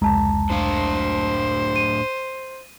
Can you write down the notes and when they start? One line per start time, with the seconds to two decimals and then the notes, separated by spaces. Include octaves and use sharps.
0.02 F1 C#2 G#3 A5 A#5
0.50 A2 D4 C5 F5
1.76 D#7